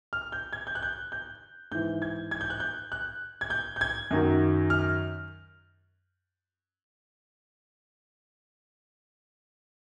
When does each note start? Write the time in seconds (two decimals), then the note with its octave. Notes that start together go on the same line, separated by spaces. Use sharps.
0.13 F6
0.32 G6
0.53 G#6
0.67 G6
0.75 F#6
0.82 G6
1.12 G6
1.71 G#2 E3 G6
2.02 G#6
2.31 G#6
2.41 G6
2.50 F#6
2.60 G6
2.92 F#6
3.41 G#6
3.50 G6
3.76 G6
3.81 G#6
4.11 F#2 D#3 F#3
4.70 F6